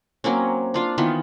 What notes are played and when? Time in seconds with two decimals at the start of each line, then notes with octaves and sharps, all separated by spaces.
0.24 F#3 A#3 C4 C#4
0.74 D4 F4 F5
0.98 D#3 E3 B3 F4